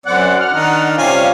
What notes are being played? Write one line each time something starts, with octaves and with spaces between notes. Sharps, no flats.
F#2 C4 D5 F#5
F#5 F6
D#3 D4 D#4
C3 G3 C#4 F4 F5 G#5